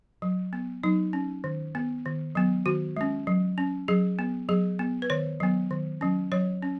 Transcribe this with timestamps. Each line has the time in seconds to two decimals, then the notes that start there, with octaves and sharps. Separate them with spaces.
0.22 F#3
0.53 B3
0.83 F#3 D#4
1.13 C#4
1.44 D#3
1.75 B3
2.05 D#3
2.35 F#3 B3
2.66 D#3 F#4
2.97 G#3 C#4
3.27 F#3
3.58 C#4
3.88 F#3 G#4
4.19 B3
4.49 F#3 G#4
4.79 B3
5.02 B4
5.10 D#3 C#5
5.40 F#3 B3
5.71 D#3
6.01 F#3 C#4
6.32 F#3 C#5
6.62 C#4